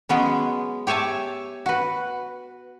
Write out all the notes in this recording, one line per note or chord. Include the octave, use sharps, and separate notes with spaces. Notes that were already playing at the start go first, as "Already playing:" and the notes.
F#3 G#3 B3 C#4
G4 C#5 E5 G#5 A5
F#4 B4